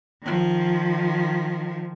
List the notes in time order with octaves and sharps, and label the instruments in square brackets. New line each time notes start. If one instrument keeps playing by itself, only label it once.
[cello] D#3 F3